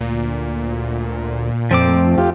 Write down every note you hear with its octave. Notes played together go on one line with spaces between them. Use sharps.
D2 A#2
F2 F3 A3 C4 D6
F2 F4 G4